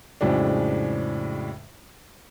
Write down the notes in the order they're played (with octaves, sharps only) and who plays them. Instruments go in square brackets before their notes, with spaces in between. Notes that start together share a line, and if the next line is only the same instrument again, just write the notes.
[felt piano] F2 A2 C#3 F#3 G#3 D4